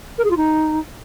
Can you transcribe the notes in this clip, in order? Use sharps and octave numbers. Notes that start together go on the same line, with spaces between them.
A#4
G#4
F4
D#4